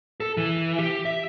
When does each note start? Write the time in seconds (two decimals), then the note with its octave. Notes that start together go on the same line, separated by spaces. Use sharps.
0.20 A4
0.37 E3
0.79 G4
1.05 E5